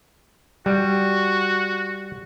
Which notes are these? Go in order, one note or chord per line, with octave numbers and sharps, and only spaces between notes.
G3 F#4